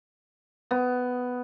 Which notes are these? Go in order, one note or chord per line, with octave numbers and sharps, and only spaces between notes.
B3